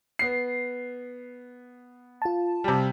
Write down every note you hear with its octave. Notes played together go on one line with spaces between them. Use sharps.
B3 C7
F4 A5
C3 G3